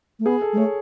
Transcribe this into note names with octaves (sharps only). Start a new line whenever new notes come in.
A3
B3 G#4
A4
G#3
A3 C#5